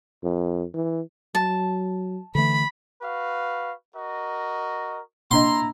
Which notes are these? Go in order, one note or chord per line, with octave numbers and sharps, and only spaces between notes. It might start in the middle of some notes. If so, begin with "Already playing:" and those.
F2
E3
F#3 A5
D3 E3 A3 B5
F#4 B4 F5
F#4 A#4 D#5
A#3 D4 E4 D#5 A#5 C6